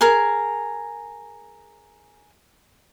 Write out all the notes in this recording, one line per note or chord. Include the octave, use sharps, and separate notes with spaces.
G#4 A#4